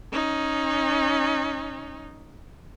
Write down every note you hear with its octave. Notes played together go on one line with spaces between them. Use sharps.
C#4 D#4